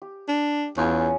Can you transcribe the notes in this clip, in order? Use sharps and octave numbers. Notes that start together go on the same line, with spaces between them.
G4
D4
E2 C#4 F4 G#4